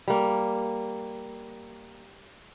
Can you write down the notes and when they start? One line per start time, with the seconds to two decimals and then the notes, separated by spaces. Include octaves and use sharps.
0.08 G3 A#3